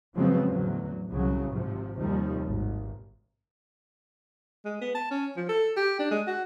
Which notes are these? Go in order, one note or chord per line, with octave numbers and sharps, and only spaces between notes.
C#3 F3 F#3 G#3 B3 C4
E2 A2 D3 F#3
C2 C#3 F#3
G#1 G#2 C3 F3
D#2 C3 D#3 F3 G3
G#1
G#3
B3
A5
C#4
F3
A4
G4
D4
G#3
F#4